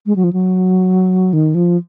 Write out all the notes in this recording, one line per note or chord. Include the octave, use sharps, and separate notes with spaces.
G#3
F#3
F3
F#3
D#3
F3